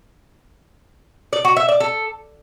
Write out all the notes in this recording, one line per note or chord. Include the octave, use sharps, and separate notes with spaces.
D5
F#4
E5
D5
A4